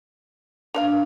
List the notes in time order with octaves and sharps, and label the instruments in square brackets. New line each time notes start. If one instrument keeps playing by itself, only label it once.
[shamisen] A#3 D5 F5 [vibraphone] D4